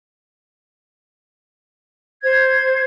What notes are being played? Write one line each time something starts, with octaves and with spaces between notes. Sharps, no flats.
C5 G#6